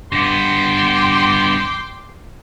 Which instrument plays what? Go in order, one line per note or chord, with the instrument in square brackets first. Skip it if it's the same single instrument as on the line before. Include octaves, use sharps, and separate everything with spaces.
[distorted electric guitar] G2 B3 [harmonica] G5 C6 D6